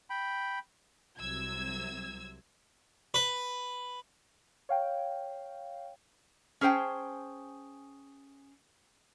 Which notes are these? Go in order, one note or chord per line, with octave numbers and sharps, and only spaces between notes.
G5 B5
C2 C3 F#3 E6 G#6
B4
C#5 F5 G5
C#4 G#4 C5 G5 A5